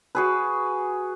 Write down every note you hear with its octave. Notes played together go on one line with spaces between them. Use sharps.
F#4 G#4 B4